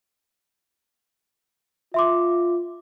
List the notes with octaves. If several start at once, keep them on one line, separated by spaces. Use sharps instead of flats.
F4 E5 C6 D6